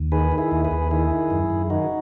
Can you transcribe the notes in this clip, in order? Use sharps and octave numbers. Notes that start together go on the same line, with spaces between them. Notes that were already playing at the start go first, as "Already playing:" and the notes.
Already playing: D#2
D#3 G#4 B4
D#3
E4 G#4
D#2
G#4 B4
D#2
D#3 E4 G#4
D#3
F#2
F#2
D#3 D#4 F#4